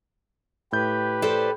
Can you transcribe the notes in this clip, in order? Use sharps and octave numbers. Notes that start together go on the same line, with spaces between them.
A2 G4 B4 G6
A4 C5 D5